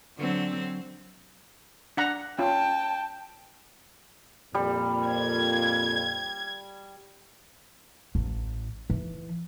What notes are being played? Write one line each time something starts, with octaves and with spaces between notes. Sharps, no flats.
D3 F#3 C4
D4 F#5 A#5
C#4 F4 G5 A5
F2 A#2 G3
G#6
A1
E3